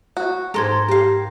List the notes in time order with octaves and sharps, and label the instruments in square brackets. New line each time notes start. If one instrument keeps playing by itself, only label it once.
[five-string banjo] F#4
[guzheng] G#2 A#4 [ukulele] A4 C5 [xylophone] A#5 C6 G#6
[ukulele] G4 [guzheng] A#4 F5